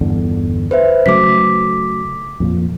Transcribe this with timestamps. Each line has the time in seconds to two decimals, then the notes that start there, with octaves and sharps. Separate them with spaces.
0.01 G1 E2 D3
0.71 B4 C5 E5
1.06 C#3 F#3 A3 D6 B6
2.40 F2 A#2 F3